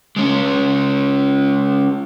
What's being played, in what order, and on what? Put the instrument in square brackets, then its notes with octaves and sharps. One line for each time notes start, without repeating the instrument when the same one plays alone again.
[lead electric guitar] G#3 C#4